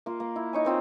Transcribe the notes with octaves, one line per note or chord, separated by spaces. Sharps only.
A#3 F4
A#3
E4
D#4 C#5 G#5
A#3 C4 F4 C#5